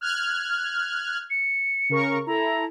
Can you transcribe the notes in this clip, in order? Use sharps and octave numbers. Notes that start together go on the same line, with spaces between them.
F6 F#6 G#6
C#7
C#3 A#4 C#6
E4 A4 A#5